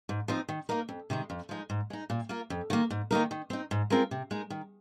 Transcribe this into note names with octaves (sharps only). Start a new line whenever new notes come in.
G#2
F3 C4 D#4
D#3
A#3 D#4 A#4
F2
C3 D#3 G#3
F2
F3 G#3 D#4
G#2
G#3 D#4
A#2
A#3 F4 A#4
F2
D#3 A#3
G#2
D#3 A#3 D#4 A#4
D#3
C4 D#4
G#2
G#3 C4 F4 A#4
C3
G#3 D#4 A#4
D#3